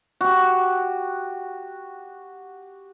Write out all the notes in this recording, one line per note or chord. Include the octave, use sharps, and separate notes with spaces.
F#4 G4